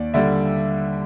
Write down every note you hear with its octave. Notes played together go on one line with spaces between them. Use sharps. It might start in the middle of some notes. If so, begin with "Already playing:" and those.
Already playing: D#2 D5
D3 G3 D5 E5